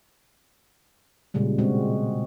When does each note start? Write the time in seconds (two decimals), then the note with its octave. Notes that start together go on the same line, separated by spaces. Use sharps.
1.34 A#2 C#3 G3 G#3
1.58 B2 G#3 C4 F#4